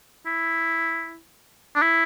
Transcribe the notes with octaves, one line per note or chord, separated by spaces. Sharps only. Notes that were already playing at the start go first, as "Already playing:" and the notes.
E4
D4
E4